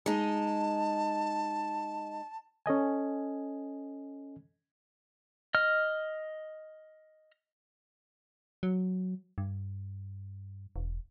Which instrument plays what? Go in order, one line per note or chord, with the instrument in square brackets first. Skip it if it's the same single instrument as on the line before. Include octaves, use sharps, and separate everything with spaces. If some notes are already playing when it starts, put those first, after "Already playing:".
[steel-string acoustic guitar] G#3 D#4 [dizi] A5
[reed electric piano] C#4 A4 D#5 G#5
[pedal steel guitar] D#5 F6
[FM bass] F#3
G2
E1